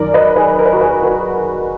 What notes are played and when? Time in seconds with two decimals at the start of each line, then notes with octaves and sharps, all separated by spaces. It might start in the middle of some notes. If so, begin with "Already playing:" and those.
Already playing: F#2 D#3 A#4 D5
0.14 B4 D#5
0.36 G#4 B4
0.59 A#4
0.66 B4
0.73 F#4 A#4
0.81 G#4 B4
1.03 F#4 A#4